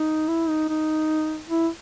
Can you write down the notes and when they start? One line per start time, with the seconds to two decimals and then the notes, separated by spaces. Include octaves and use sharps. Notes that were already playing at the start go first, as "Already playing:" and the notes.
Already playing: D#4
0.28 E4
0.49 D#4
0.69 D#4
1.50 E4